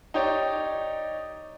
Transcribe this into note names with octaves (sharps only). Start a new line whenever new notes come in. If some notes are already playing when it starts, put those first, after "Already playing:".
D#4 G4 C#5 D5